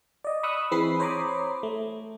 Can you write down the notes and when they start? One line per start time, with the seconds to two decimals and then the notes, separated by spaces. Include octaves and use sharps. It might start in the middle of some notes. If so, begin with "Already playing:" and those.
0.24 D5 D#5
0.43 B5 C#6 D#6 E6 F#6
0.71 E3 C4 G#4 B4 B5 C7
1.00 C5 C#5 A#5 B5 D6 D#6
1.63 A3